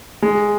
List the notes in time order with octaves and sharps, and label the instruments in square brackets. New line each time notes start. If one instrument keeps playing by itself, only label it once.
[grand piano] G#3